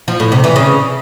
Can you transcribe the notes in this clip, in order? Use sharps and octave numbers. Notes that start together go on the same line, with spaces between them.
F3
A2
C3
E3
C#3